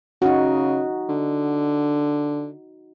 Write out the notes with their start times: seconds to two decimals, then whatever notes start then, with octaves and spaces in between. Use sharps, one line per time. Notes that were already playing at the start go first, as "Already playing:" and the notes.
0.22 C#3 D#4 F#4
1.09 D3